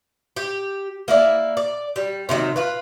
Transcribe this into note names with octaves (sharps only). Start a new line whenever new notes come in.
G4
A#3 E4 D5
D5
G3
C3 D#3 F3 F#3
F4 B4